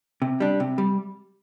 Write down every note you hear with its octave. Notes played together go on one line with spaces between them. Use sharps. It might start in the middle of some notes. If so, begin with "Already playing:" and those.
C3
G3 D4
C3
G3